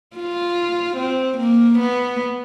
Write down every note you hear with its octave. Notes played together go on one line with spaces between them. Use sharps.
F4
C4
A#3
B3